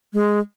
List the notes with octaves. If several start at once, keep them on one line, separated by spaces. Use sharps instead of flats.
G#3